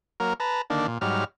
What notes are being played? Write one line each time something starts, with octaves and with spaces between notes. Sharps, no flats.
F#3 A#3 A#4
B4 A5 A#5
D3 D#3 A#3 D4
A#2
G#2 F#3 G3 F6